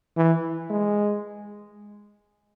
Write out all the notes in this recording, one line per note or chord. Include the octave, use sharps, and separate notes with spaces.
E3
G#3